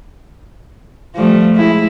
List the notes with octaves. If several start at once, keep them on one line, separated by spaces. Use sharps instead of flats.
F3 G3 A3
G#3 E4